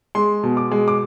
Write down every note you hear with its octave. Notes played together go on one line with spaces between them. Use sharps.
G#3 C6
B2
D6
G#3
D6